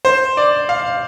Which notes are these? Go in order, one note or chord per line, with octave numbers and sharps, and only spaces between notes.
C5
D5
F5